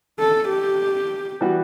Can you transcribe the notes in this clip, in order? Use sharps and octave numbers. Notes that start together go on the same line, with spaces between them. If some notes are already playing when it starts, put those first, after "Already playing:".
A4
G4
E3 G3 B3 F#4